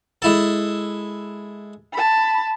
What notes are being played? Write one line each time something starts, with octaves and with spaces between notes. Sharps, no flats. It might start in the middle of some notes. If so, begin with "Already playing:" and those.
G#3 E4 A4
A5 B5